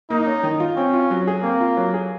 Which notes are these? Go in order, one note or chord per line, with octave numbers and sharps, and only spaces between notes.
A#3 D#4
C#4
D#3
F4
C4 C#4
F4
F#3
G#4
A#3 C4
F4
F#3
G#4